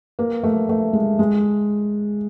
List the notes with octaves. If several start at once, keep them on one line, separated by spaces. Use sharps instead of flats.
A#3
A3
A3
G#3
G#3